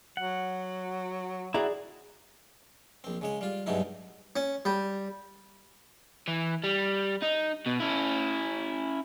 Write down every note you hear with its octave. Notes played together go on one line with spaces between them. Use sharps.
F#3 F#5
E4 F#4 G#4 D5 A#5
A#1 C4
C#3 G#3 C#5
G3 F4
G2 B2 F#3 G#3 D#4 E4
C#4
G3
E3
G3
D#4
B2
C#4 E4